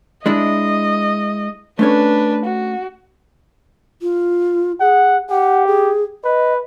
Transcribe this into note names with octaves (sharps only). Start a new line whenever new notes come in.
G#3 D4 E4 D#5
A3 C#4 D4 B4 C#5
F#4
F4
G#4 F#5
G4 F#5
G#4
B4 D#5